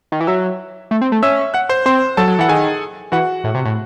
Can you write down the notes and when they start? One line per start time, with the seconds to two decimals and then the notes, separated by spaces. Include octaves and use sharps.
0.12 D#3
0.20 E3
0.27 F#3 E5 E6
0.91 A3
1.01 C4
1.12 A3
1.23 C#4 E5 E6
1.54 F#5 F#6
1.69 C5 C6
1.86 C4 C5 C6
2.17 F#3 A4 A5
2.28 F#3
2.39 E3 F#5
2.49 D#3 G#4 G#5
3.12 E3 F#4 F#5
3.44 A2
3.55 C3
3.65 A2